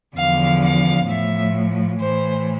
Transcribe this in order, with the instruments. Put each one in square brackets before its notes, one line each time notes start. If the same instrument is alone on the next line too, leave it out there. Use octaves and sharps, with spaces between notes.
[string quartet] E2 D3 F3 F5
F5
A2 F3 E5
A2 E3 C5